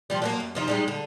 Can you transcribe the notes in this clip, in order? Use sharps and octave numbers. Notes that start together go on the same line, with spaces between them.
C3 F3 G3
F#3 G#3 A#3
F#2
C3 F3 D#4
G3 G#3 D#4
D3